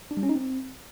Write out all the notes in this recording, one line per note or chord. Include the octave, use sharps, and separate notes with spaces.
D4
G3
C#4
D#4
C4